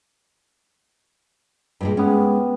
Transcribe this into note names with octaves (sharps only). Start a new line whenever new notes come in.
G2 A#2 G#3
G#3 B3 C#4 G4